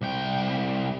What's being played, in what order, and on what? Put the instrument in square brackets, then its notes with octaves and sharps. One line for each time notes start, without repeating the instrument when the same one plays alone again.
[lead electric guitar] C2 G5